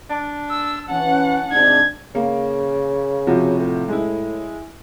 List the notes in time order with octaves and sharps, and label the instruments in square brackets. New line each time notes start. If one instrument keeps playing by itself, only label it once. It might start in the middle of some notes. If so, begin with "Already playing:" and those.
[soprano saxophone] D4
[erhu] E6
[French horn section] E3 C#4 [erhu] F#5 [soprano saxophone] A5
[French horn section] G#2 C3 D4 [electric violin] G#6
[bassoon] C#3 [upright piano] A#3
[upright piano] C3 F3 F#4
[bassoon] A2
[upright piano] G#3 E4